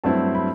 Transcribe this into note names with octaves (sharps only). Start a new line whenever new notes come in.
G2 F#3 A3 C4 E4 A5
B5